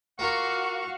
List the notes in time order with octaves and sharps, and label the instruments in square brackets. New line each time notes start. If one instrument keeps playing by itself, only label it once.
[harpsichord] A#3 F4 A#4 [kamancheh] F#4 F5 [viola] C#6